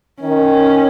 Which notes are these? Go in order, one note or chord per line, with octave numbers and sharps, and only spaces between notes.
D#3 C#4